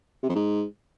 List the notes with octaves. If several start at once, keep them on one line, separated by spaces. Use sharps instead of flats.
C3
F2
G#2